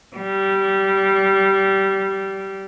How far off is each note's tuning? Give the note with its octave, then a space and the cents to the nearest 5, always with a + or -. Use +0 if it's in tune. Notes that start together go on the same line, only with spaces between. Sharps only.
G3 -15